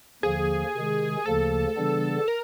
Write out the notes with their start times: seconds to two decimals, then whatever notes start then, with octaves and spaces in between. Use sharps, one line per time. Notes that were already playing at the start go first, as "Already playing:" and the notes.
0.23 D#2 D3 F3 A#3 G#4
0.75 C3 D#3 G#3
1.26 D2 C#3 F3 A#3 A4
1.76 C#3 E3 G3 B3 D4
2.28 A#4